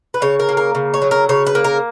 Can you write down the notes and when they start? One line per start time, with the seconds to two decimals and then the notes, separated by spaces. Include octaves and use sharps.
0.14 B4
0.22 C#3 C#5
0.40 A#4
0.49 A#3
0.57 A#4
0.75 C#3
0.94 C#5
1.02 F#3
1.11 A#4
1.29 C#3 C#5
1.47 B4
1.55 A#3
1.64 A#4